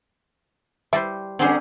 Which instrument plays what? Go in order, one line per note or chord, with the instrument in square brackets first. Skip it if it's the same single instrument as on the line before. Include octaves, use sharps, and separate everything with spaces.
[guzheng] G3 C5 [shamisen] E4 D5 E5
[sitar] D3 G3 C#4 [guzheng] C4 G#4 C5 [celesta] F#5 D6